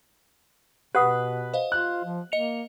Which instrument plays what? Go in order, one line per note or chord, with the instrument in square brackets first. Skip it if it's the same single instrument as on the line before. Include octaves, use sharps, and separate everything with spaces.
[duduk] B2 [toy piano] G4 F#5 D#6 [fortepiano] B4 [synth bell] F#6
[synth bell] C5 D#5 F5
[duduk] F4 [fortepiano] F#6
[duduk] F3
[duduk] A#3 [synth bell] D#5 C#7 F7